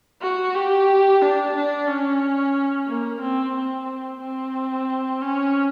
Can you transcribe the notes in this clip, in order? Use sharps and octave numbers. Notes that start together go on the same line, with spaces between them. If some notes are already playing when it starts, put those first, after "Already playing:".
F#4
G4
D4
D4
C#4
A#3
C4
C4
C4
C#4